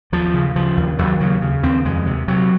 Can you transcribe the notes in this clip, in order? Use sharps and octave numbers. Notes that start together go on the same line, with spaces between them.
D#2 F3
C#3
C#3 F3
D#2
D#2 F#3
C#3 F#3
C#3
D#2 C4
F2 G#3
C3
C3 F#3